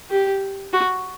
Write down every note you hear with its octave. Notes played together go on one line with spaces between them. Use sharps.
G4
F#4